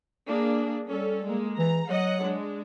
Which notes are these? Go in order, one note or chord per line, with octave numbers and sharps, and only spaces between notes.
A#3 D4 G#4
G3 C#4 A4
G#3 A#3
E3 A#5
F#3 D#5 F#5
G#3 D4